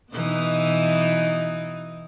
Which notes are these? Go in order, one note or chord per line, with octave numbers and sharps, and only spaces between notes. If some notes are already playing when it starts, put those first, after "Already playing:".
B2 E3 D#4